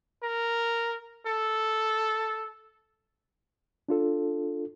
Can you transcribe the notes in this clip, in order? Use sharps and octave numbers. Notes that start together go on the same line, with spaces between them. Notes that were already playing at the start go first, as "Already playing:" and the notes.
A#4
A4
D4 F4 A4